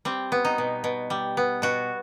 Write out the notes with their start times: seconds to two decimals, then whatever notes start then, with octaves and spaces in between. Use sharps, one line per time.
0.05 G3 C4
0.32 B3
0.45 D#4
0.58 B2
0.84 B2
1.10 G3
1.37 B3
1.62 B2 F#4